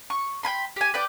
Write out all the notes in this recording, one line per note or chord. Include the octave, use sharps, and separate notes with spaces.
C#6
G5 G#5 B5 C6
G4 G#5
B4 D5 G5